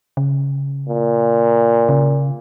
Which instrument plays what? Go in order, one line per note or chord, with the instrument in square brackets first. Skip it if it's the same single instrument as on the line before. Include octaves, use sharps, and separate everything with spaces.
[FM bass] C#3
[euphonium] A#2
[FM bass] C#3